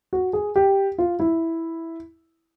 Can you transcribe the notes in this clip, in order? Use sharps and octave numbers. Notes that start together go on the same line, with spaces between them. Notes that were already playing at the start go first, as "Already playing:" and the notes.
F#4
G#4
G4
F4
E4